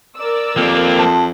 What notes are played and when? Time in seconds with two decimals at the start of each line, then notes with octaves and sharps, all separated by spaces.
0.16 A#4 D5 E6
0.57 F2 A#3 G4
0.99 F3 C5 A5